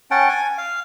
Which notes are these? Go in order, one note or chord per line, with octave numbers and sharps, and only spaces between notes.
C#4 F#5 G5 A5
G#5
F5